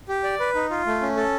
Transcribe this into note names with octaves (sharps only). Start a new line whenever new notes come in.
G4
D5
B4
D#4
F4
A3
C#4
A4